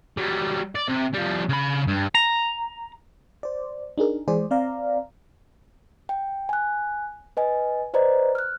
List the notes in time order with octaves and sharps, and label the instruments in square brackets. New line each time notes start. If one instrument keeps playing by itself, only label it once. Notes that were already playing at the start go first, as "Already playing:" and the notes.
[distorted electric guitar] F#3 G3
D5
C3
F3 G3
C#3 B5
G2
[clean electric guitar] A#5
[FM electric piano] C5 D5
D4 D#4 G#4 A#4
E3 G#3 G#4 C5 D5
C4 D5 F5 A#5
[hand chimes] G5
G#5 F#6
B4 D#5 G#5
B4 C5 D5 D#5 A#5
F6 F#6